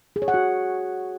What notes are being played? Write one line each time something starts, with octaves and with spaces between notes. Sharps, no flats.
G#4
C#5
F#5
F#4